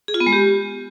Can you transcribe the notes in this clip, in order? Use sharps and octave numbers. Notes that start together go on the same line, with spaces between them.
G#4
F4
B3
G#3
G4